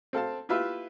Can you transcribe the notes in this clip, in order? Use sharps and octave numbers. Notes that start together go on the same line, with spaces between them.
C4 A4 F5 A5
E4 F4 G4 B4 E5 F5